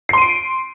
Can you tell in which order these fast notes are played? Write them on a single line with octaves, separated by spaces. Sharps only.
C7 C6 D#7 D7